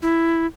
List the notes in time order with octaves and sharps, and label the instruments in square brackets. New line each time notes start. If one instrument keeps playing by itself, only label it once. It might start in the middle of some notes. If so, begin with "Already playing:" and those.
[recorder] E4